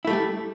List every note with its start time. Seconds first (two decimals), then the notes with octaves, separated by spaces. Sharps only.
0.05 E4
0.07 A3
0.10 G3
0.13 A4